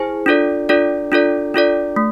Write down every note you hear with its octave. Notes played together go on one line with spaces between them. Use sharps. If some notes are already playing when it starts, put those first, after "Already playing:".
Already playing: E4 G#4 C5 G#5
D4 F4 A4 D5
D4 F4 A4 D5
D4 F4 A4 D5
D4 F4 A4 D5
A3